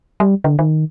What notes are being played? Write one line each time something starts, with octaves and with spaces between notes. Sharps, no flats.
G3
D3
D#3